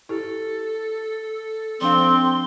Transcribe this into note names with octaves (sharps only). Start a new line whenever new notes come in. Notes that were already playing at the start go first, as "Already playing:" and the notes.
E4 G4 A4
F3 C4 D4 F5 C6